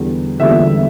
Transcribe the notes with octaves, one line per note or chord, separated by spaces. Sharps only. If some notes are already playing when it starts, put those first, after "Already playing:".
Already playing: E2 D3 G3
E2 D3 G3 E5